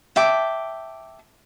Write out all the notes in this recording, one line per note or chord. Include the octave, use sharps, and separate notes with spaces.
E5 G5 A5 D6